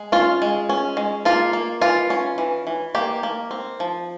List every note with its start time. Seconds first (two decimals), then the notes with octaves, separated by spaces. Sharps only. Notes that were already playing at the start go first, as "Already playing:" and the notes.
Already playing: G#3
0.12 C#4 F4
0.42 G#3
0.69 C#4
0.97 G#3
1.25 A#3 F4
1.53 A#3
1.81 E3 F4
2.10 C#4
2.38 E3
2.67 E3
2.95 A#3 G4
3.23 A#3
3.51 C4
3.80 F3